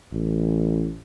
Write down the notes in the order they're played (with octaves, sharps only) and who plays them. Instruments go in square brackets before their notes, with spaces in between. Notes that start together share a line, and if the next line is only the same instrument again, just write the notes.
[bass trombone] A1